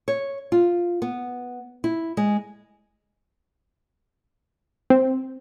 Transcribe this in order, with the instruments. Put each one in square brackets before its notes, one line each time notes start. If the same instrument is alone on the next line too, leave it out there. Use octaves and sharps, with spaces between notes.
[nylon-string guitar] C#5
F4
B3
E4
G#3
[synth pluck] C4